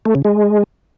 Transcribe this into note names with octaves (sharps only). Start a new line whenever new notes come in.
A3
C#3
G#3